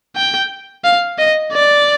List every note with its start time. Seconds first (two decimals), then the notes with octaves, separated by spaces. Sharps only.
0.16 G5
0.84 F5
1.19 D#5
1.53 D5